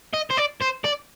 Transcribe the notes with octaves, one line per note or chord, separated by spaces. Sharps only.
D#5
C5
D5
C5
D5